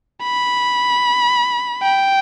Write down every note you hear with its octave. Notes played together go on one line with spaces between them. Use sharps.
B5
G5